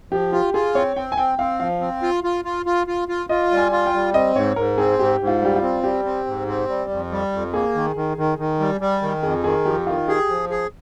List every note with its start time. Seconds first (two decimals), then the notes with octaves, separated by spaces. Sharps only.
0.11 F3 G4
0.33 F4 G4
0.54 F4 G#4
0.75 C4 C#5
0.96 C4 G5
1.12 G#5
1.18 C4 G5
1.39 C4 F5
1.60 F3 F5
1.81 C4
2.02 F4
2.24 F4
2.45 F4
2.66 F4
2.87 F4
3.08 F4
3.29 F4 D#5
3.51 G3
3.57 G#5
3.72 F4
3.86 G5
3.93 G3
4.14 C4 D#5
4.35 G#2 C#5
4.56 G#2 A#4
4.78 C4 G#4
4.99 G#2 G4
5.20 G#2
5.27 F4
5.42 G3 G4
5.56 F4
5.62 C4
5.83 G3 G4
6.05 C4
6.26 G#2
6.48 C4
6.69 G3
6.90 F2
7.11 G3
7.32 F2
7.54 A#3 G#4
7.75 D#3
7.96 D#3
8.17 D#3
8.38 D#3
8.60 G3
8.81 G3
9.02 D#3
9.23 F2 G#4
9.44 D#3 G#4
9.65 F2 G4
9.87 D#3 F4
10.08 G4 G#4
10.29 F3
10.50 G#4